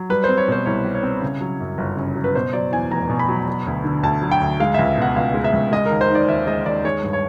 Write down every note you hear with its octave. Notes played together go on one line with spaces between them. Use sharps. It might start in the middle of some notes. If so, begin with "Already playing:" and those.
Already playing: F#3
G3 B4
C4 C5
C#5
B2 C5
C2 C#5
G3
C#5
C4
C#3
F#3
F#2
G1
C#3
F#3
B4
B2 C5
F#3 D5
E2 G#5
F1 A#5
B2
B5
F#3
F#3
D2
D3
D2 A5
F#3
G5
D2
G#3 F5
C#2 E5
B2 F#5
C#2 F5
G#3
E5
C#2
G#3 D#5
A#4
D#2
C5
D#3
D5
D#2 E5
G#3 D#5
D#2 D5
G#3 C#5
G2
C#5